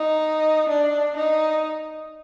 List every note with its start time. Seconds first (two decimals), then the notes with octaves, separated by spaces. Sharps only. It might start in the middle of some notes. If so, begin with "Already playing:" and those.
Already playing: D#4
0.69 D4
1.17 D#4